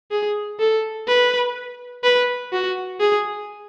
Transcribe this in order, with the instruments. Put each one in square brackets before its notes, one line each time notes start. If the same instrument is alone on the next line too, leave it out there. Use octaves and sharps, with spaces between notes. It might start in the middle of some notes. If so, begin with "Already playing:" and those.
[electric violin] G#4
A4
B4
B4
F#4
G#4